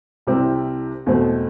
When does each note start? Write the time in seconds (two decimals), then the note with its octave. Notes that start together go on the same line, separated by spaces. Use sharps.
0.27 C2 C3 G3 C4 E4
1.06 E2 B2 A3 C4